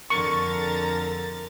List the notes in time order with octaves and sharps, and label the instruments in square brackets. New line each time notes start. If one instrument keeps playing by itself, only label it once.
[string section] F2 D3 A6 [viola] A#4 [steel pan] C#6